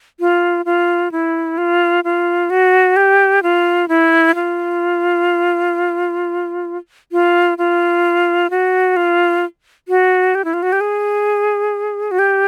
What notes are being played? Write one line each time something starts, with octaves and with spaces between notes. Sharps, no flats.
F4
F4
E4
F4
F4
F#4
G4
F4
E4
F4
F4
F4
F#4
F4
F#4
G4
E4
F4
F#4
G4
G#4
F#4
G4